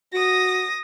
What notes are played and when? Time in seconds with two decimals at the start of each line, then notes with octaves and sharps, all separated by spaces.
0.13 F#4 D#6 A#6